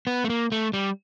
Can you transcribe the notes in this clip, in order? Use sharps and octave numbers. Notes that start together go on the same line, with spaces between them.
B3
A3
A#3
A3
G3